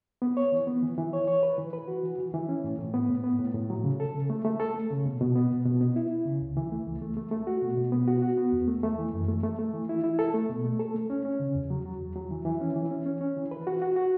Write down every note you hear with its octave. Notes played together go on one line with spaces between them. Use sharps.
B3
C#5
E3
B3
E3
E3
C#5
C#5
B4
E3
B4
F#4
E3
E3
E3
C#4
A2
A2
B3
A2
B3
A2
A2
F#3
C#3
A4
C#3
A3
A3
A4
A3
C#3
B2
B2
B3
B2
B2
B3
E4
E4
C#3
C#2
E3
A3
C#2
A3
A3
A3
F#4
B2
B2
B3
F#4
F#4
B3
E2
A3
A3
E3
F#2
A3
A3
A3
E3
E4
E4
A4
A3
B2
A3
A4
A3
C#4
C#4
C#3
E2
F#3
F#3
E2
F#3
E3
E3
C#4
E3
C#4
C#4
C#4
E3
B4
F#4
F#4
F#4